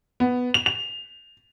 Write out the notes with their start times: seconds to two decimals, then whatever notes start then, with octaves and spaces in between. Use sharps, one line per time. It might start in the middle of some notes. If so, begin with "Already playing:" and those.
0.20 B3
0.54 F7
0.66 F7